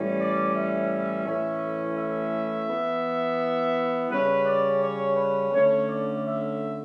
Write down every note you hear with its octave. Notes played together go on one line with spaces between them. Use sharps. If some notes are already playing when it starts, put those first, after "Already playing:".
Already playing: A2 E3 G3 C#4
D5
E5
A2 E3 A3 C#4
E5
E3 B3
C#3 G3 C#4 B4
D5
C#5
B4
D3 A3 C#4 C#5
D5
E5